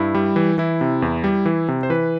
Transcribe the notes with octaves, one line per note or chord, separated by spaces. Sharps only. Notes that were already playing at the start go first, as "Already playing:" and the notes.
Already playing: G2 E4
G3
E3
E3 E4
C3
E2
G3
E3
C3
C5
E3 B4